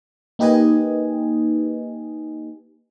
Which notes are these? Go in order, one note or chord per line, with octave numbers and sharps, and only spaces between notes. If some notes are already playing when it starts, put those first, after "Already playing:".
A#3 D#4 G4 B4 D#5 G#5